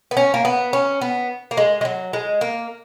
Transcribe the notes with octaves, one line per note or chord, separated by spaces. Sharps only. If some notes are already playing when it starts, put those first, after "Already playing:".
B3
C#4
A#3
B3
C#4
B3
A#3
G#3
G#3
F#3
G#3
A#3